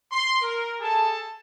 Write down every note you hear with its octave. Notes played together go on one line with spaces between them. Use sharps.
C6
A#4
G#4 A4 A5